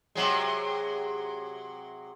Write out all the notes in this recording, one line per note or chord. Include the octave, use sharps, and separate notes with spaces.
C3 F#3 G#3